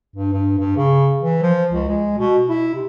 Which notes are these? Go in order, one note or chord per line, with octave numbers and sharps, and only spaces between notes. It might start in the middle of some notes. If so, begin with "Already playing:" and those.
G2
G2
G2
C#3
E3
F3
C#2
G#3
B2
E4
C3